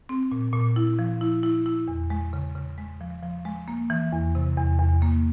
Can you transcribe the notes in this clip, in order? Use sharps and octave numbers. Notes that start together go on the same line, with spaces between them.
C4
A#2
A#2
E4
F3
E4
E4
E4
E2
G#3
C#3
C#3
G#3
F3
F3
G#3
A#3
E3
E2
C3
E2
E2
A#3